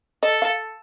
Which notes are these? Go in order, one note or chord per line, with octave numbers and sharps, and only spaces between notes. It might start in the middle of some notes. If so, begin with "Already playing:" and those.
A4 D#5
F5